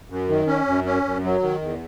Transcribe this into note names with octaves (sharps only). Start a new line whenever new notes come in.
F#2
D#3
C#4
F#2
C#4
F#2
F#3
D#3
E2